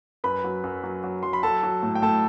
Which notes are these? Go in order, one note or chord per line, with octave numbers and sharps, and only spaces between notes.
F#2 B4 B5
F#3
F#2
F#3
F#3
F#3 C6
B5
F#3 A4 A5
F#3
A2
G5
A2 A4 A5